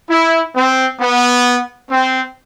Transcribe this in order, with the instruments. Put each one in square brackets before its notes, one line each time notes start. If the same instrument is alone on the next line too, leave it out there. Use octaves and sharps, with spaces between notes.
[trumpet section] E4
C4
B3
C4